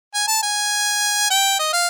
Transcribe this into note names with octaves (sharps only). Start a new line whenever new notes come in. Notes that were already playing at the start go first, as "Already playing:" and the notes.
G#5
A5
G#5
G5
D#5
F5